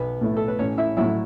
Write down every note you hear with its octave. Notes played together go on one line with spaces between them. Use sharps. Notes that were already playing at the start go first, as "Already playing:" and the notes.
Already playing: B1 B3 B4
A2 A3 E4
A4
B4
A1 C#4 C#5
E4 E5
A2 F#3 E4 E5